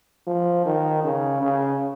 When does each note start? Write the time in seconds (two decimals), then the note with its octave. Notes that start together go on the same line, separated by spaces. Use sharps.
0.27 F3
0.65 D#3
1.04 C#3
1.42 C#3